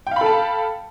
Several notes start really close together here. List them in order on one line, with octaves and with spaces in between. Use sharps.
G5 F5 B5 A4 A5